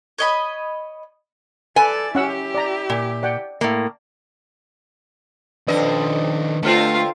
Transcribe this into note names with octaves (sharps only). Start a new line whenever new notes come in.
C#5 D#5 B5
A4 B4 D5 G#5
C#4 E4 G4 F#5 E6
D5 A#5
A#2
D5 F#5 G5
A2 A#3
F2 D#3 F#3 D4 B4 D5 D#5
D3 A3 C4 F4 F5